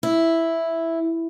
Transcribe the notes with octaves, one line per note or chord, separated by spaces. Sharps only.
E4